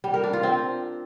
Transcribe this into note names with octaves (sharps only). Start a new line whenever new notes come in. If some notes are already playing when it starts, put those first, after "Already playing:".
G3
A#4
D4
F4
C4